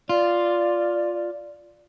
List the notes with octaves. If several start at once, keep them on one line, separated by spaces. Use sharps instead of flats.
F4 D5